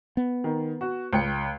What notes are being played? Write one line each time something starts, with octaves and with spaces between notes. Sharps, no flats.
B3
D#3
F#4
C#2 G5 C#7